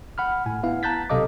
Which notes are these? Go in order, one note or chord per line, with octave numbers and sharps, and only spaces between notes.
F#5 B5 F6
A2 G#5
B3 E4 F5 F#5
A5 A#5 F#6 G6 A6 B6
B1 C3 A4 D#5 F5 D6